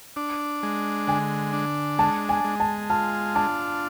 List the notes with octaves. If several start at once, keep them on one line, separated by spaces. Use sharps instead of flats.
D4
G#3
D3 G#5
D4
G#3 A5
G#5
G#3
A5
F4 A5
D4 A5